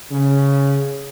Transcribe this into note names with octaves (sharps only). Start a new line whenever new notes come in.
C#3